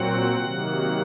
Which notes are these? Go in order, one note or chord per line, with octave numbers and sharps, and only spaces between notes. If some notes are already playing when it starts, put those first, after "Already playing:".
Already playing: A#2 F#3 C4 F#5
C3 D#3 F#3 A#3